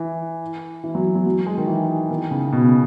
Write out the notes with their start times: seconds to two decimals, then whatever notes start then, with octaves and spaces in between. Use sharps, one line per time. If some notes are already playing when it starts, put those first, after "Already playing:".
Already playing: E3
0.84 E3
0.95 F#3
1.15 F#3
1.26 F#3
1.46 G#3
1.58 D#3
1.68 E3
2.11 D#3
2.31 C#3
2.52 B2
2.64 C#3